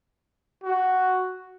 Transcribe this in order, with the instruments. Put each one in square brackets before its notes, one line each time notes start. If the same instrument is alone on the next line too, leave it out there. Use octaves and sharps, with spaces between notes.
[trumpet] F#4